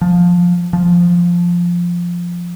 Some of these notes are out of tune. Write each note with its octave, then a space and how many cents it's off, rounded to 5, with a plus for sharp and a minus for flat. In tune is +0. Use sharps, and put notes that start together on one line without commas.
F3 +10
F3 +0